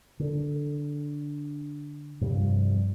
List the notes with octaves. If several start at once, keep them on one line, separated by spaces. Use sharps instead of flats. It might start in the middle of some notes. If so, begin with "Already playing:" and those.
D3
G2 C3 F3 G3